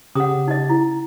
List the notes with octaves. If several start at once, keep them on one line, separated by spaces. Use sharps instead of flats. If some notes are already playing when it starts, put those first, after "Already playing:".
C#3 G4 F#5 D#6
D#4 D#5
E4